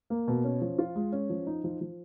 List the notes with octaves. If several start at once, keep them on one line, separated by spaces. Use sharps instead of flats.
A#3
B2
C#4
F3
F4
G#3
C#4
F3
D#4
F3
F3